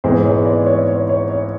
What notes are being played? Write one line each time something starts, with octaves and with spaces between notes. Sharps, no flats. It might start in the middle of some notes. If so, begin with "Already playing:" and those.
G#2 E3 G#3 B3 C5
C#5
D5
C#5
C#5
C#5
C#5